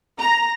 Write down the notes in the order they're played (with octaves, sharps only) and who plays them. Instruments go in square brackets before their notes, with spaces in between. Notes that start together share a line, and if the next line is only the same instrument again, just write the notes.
[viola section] A#5